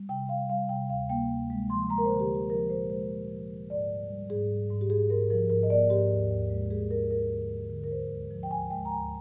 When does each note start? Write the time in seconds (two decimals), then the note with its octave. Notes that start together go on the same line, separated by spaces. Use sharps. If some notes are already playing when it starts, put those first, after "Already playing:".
Already playing: G3
0.09 C3 G5
0.29 G3 F5
0.49 G3 F5
0.69 C3 G5
0.89 D2 F5
1.10 A#3 G5
1.29 D2
1.50 G#3
1.70 F3 C6
1.90 G#3 A#5
1.98 A#4
2.05 C5
2.10 D3
2.20 G4
2.29 D3
2.35 G4
2.50 F3 A#4
2.70 A#2 C5
2.90 G#3 C5
3.10 A#2
3.30 F3
3.50 G#3
3.70 G#2 D5
3.89 G3
4.10 G3
4.30 G#2 G#4
4.50 G3
4.70 G#2
4.81 G4
4.90 G#2 G#4
5.10 G#2 A#4
5.30 F3 A#4
5.50 G#2 A#4
5.63 D#5
5.70 A#3 D5
5.90 G#2 G4
6.10 D#2
6.30 D#2
6.50 G#3
6.70 G#3 G#4
6.90 D#2 A#4
7.11 D#2 A#4
7.31 D3
7.51 G#3
7.70 D3
7.84 A#4
7.91 D2 C5
8.10 G#3
8.31 F3
8.43 G5
8.50 D2 G#5
8.70 G#3 G5
8.85 A#5
8.90 D2 G#5